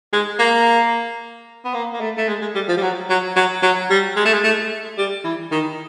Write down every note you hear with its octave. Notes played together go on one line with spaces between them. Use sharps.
G#3
A#3
B3
A#3
A#3
A3
A3
G#3
G#3
G3
F3
G3
F#3
F#3
F#3
F#3
G3
G#3
A3
G#3
A3
G3
E3
D#3